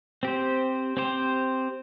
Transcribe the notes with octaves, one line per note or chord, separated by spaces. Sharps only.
C4 G4 C5
C4 G4 C5